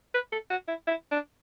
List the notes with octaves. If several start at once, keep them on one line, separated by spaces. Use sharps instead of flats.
B4
A4
F#4
E4
E4
D4